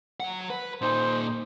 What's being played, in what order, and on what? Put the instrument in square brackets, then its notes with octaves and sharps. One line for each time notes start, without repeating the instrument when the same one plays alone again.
[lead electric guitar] F#3 F#5
B4
[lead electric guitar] A#2 D#4 [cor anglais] C5